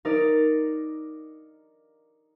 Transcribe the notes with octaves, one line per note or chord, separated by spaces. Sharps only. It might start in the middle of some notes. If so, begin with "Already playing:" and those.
D#4 A#4 D5